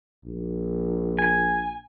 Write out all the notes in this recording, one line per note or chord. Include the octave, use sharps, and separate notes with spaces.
A#1
G#5